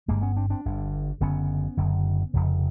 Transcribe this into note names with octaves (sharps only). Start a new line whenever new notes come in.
G1 G2 D3 G#3 A#3
B3 C#4
C4 D4
C4 D4
G1 G2 D3
F#1 F#2 D3 B3 C#4
F#1 F#2 D3
F1 F2 C#3